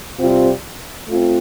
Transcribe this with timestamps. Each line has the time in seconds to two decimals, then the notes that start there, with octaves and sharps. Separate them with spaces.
0.20 C3 G3 C4 F4
1.08 A3 C4 F4